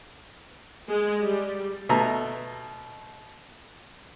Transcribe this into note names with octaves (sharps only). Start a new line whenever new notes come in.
G#3
G3
B2 A3 A#5